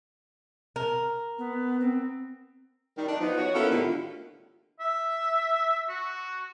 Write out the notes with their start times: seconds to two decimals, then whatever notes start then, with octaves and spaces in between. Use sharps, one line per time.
0.76 A#4
1.38 B3
1.80 C4
2.97 D#3 G3 A#4
3.08 D4 D#4
3.20 F3 B3 D#4
3.38 F#4 C#5
3.54 A#3 B3 C#4 E4 F#4 A4
3.71 A2 D3 D#3 G3 F4
4.80 E5
5.89 F#4